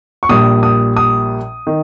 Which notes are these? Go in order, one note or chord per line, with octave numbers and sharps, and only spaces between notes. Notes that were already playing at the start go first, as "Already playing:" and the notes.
C#6
A#1 A#2 G3 D#6
D#6
D#6
D#3